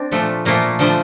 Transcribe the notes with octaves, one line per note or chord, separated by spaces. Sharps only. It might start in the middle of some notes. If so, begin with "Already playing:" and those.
Already playing: C4 D4
A#2 F3 A3
A#2 F3 A3 A#3
D3 F3 A3